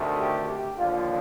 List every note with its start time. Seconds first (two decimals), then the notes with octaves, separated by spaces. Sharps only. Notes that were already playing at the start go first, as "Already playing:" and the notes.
Already playing: D2 C3 D#3 A3
0.21 G4
0.49 G4
0.78 D#2 D3 F3 F4